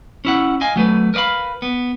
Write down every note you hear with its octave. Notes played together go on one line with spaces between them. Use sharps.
C#4 E4 F#5
D#5 F5 G#5
F#3 A3 B4
A#4 B4 D5 F5 B5
B3